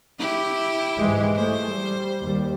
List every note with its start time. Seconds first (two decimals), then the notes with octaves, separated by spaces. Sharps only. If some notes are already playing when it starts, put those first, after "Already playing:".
0.19 E4 G4
0.98 G#2 E3 G#3
1.36 A3 C5
1.70 G3
2.22 D#2 G3